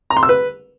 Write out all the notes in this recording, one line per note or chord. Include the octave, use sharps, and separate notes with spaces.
A#5
C6
E6
B4